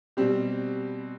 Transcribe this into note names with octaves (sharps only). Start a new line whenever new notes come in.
B2 G3 C4 G4